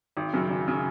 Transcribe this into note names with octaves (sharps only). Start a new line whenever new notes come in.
G#1
F#2 C#3
G#1
C#3